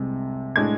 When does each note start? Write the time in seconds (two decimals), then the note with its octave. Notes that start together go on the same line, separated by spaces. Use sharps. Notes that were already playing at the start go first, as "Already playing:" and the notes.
Already playing: C2 C3 G#3 C4
0.56 A2 G#3 D4 G#6